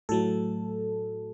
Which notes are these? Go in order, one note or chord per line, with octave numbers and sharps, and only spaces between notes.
A2 F#3 A3 A4